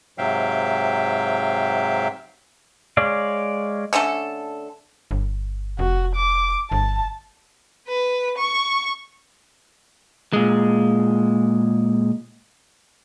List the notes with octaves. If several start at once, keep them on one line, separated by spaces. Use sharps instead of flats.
G#2 C3 F#3 E5 F5 G5
G#3 C#5 D5 F5
D3 A3 C#4 A4
G1
F1 F#4
D6
G1 A5
B4
C#6
A#2 G#3